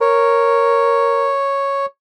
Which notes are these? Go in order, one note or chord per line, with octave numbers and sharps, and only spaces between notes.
A#4 C#5